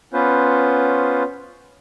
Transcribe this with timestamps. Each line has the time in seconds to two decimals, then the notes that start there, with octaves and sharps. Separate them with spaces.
0.13 B3 C#4 F4 B4 C5